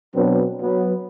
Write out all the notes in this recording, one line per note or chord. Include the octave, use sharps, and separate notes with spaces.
B2 F#3 C4 D4 B4
F#3 B3